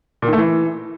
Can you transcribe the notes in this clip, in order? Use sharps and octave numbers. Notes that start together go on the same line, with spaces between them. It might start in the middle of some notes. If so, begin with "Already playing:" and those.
A#2
D#3
A3
E3